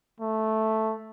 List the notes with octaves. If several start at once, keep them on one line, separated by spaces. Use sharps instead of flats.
A3